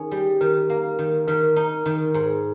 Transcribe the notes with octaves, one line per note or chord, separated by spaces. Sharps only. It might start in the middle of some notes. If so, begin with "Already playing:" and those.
Already playing: D#3 C#4 G#4
G3
D#3 A#4
A#3
D#3
D#3 A#4
D#4
D#3
G#2